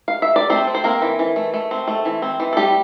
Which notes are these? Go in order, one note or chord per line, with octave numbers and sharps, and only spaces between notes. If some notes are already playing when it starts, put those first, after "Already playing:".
F5
E5
D5
A3 C4 C5
C4
C5
A#3 C4 A#4
E3
E3
A3
A3
C4
A3
E3
C4
E3
A4
G3 A3 G4